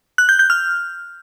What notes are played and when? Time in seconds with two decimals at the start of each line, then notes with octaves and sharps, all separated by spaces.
0.18 F#6
0.29 G6
0.39 G6
0.50 F6